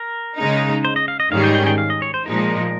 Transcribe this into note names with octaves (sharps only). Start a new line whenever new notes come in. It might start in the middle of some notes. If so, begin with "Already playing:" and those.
Already playing: A#4
C#3 G#3 D#4
C5
D#5
F5
D#5
G#2 D#3 G3 C#4 G#4 F5
G5
G5
G5
F5
D#5
C#5
C5
A#2 F3 G#3 D#4 A#4